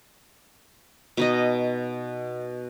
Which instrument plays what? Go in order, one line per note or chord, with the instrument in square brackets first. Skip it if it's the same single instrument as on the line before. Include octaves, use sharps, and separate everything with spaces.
[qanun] B2 D#4 D#5